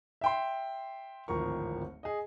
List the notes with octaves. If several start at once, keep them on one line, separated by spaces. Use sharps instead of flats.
E5 G5 C6
D1 G#1 F3 A#4 C#6
G#4 D#5